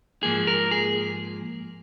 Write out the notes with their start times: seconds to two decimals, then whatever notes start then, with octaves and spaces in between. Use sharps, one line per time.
0.23 G#2 F3 A#3 G#4
0.47 A#4
0.71 G#4